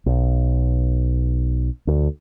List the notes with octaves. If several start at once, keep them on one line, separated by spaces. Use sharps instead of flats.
B1
D2